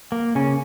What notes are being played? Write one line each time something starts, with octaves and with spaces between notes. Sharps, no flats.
A#3
C#3 C#4